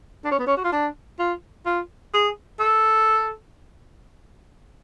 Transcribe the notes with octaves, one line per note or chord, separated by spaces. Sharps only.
D4
C#4
B3
C#4
F#4
F4
D4
F4
F4
G#4
A4